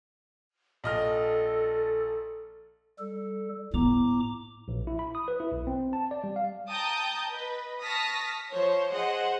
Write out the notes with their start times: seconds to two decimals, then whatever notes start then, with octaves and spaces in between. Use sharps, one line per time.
0.84 A#1 A4 D#5 F6
2.99 G3 A4
3.74 A2 B3 A#5 D6
4.68 A#1
4.87 E4
4.99 B5
5.15 D#6
5.28 B4
5.40 E4
5.52 B1
5.67 C4
5.93 A5
6.11 D5
6.24 G3
6.36 F5
6.69 G5 A5 A#5 D#6 G6
7.28 B4 D#5
7.82 A5 C#6 D#6 F6 A#6 B6
8.51 F3 C5 C#5
8.93 G#4 C5 D#5 F#5